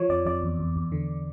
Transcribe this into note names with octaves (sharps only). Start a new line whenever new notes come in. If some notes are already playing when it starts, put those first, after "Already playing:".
Already playing: F3 C#5
F2 D5
F2 D5
E2
E2
E2
D3